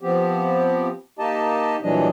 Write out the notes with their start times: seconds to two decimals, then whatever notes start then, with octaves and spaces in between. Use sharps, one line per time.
0.01 F3 B3 C4 G4
1.19 A#3 D#4 G4 D#5 A5
1.82 A#2 E3 F#3 G3 D4 D#5